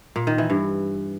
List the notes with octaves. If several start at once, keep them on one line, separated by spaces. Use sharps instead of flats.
A#2
D#3
E3
G2